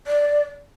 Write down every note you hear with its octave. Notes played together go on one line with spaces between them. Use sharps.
D5